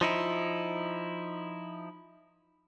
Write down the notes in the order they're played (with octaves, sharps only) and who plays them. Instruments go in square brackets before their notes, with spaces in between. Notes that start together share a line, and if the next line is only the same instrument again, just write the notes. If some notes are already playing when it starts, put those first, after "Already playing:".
[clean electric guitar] F3 D#4 E4